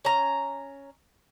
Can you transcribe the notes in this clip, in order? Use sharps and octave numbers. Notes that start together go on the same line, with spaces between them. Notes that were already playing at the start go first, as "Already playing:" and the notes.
C#4 A#5